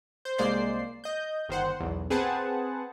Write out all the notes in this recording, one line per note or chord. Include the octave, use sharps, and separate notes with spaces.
C5
C2 G#3 A#3 C5 D5 C7
D#5 G6
G1 D#3 C5 F#5
B1 E2
C4 G#4 B4 C5 F#5 A5